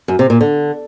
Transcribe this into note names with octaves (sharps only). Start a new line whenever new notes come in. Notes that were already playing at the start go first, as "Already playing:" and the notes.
F#2
C3
A#2
D3